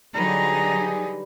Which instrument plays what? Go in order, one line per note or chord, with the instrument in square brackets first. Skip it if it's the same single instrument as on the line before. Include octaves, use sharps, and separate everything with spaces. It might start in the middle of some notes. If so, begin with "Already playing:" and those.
[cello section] D3 F#3 D#4 [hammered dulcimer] G3 B4 [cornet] G#4 [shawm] A#5